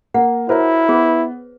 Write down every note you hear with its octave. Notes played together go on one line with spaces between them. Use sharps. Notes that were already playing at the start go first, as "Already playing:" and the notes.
A#3 F#5
E4 F#4 A#4 C5 C#5
B3 G#4 B4